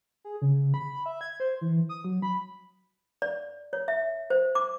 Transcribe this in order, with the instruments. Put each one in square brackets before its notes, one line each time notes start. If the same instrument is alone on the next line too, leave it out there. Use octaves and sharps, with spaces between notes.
[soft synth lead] G#4
C#3
B5
E5
G#6
C5
E3
D#6
F#3
B5
[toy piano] D5
C#5
E5
C5
D6